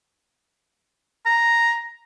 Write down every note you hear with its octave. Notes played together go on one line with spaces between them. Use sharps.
A#5